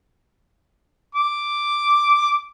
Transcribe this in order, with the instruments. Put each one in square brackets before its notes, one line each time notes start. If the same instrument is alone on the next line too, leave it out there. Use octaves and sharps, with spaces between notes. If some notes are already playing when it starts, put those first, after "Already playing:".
[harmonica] D6